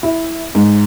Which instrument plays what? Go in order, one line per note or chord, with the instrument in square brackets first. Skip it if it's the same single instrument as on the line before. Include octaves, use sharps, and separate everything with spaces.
[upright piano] E4
G#2